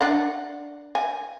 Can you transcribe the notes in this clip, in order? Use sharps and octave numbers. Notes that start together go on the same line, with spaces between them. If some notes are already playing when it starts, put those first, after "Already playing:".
D4 D5 F#5
G#5